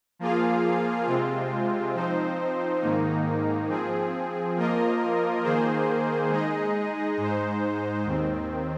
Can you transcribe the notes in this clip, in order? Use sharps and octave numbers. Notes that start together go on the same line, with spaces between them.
F3 A#3 F4 G#4 F5
C3 G#3 C4 F4
F3 C4 D#4 C5
G#2 D#3 A#3 D#4
F3 C4 G#4
F3 A#3 F4 A#4 D#5
D#3 A#3 G#4 C5
G#3 D#4 G#4 D#5
G#2 G#3 D#4 C5
D#2 D#3 C4